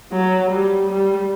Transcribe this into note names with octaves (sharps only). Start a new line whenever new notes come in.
F#3
G3
G3